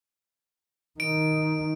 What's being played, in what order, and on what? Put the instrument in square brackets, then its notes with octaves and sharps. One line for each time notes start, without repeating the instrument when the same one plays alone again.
[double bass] D#3 D#4 [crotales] D7